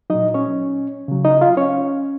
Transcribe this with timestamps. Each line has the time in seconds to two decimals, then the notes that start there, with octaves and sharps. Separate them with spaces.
0.10 A#2 F#3 D#4 D#5
0.34 C#4 C#5
1.08 C#3 F#3
1.25 D#4 D#5
1.41 F4 F5
1.57 C#4 C#5